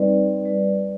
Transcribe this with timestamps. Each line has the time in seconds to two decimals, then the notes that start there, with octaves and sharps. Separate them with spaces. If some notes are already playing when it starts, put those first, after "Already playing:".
Already playing: G3 C4 D#4 B4 D5
0.45 G3